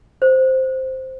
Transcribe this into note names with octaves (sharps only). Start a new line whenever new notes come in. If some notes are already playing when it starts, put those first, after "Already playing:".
C5